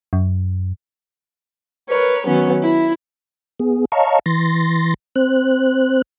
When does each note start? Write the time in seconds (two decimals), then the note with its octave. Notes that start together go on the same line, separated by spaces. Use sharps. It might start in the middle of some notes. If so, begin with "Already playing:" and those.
0.13 F#2
1.88 A#4 B4 C#5
2.26 D#3 F#3 B3 C#4
2.62 E4
3.60 B3 G#4
3.92 C#5 D#5 F5 A5 A#5 C#6
4.26 E3 C6 A6 A#6
5.16 C4 C5 F#6